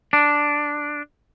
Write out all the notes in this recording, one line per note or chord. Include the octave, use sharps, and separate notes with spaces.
D4